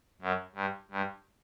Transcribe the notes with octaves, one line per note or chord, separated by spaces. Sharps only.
F#2
G2
G2